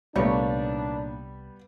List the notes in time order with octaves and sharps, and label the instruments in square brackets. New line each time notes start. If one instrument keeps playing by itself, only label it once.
[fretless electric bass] C2 A3 [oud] A#2 C#5 [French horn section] D#3 D4 [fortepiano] G3 B3